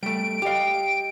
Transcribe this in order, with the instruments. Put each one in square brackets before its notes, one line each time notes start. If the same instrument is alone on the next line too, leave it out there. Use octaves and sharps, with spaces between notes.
[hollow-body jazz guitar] G3 A3 [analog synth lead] D7
[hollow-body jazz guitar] G4 F5 [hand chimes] D#5 G5